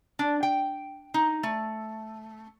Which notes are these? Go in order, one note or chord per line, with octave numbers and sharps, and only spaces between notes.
D4
G5
D#4
A3